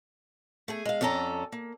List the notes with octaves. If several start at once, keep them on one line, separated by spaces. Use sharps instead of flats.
A3 G#4 G#5
G#3 F5
F2 C#4 A4 D5 A#5
A#3